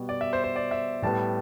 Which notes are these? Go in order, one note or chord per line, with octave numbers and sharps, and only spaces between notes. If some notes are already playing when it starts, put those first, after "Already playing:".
Already playing: B2 G3 B3
D5
E5
C5
C5
D5
E5
A2 G3 B3 A5